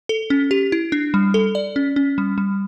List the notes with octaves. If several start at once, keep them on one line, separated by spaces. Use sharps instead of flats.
A4
C#4
G4
E4
D4
G3
A4
D5
C#4
C#4
G3
G3